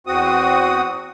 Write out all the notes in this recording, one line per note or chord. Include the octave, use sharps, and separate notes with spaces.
E2 C4 F#4 D#6